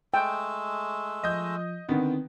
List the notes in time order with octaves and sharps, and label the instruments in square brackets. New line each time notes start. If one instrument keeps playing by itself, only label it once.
[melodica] G#3 A3 E6 [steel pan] G5
[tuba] F3 [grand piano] D#5 G6
[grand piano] D3 D#3 B3 [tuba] C4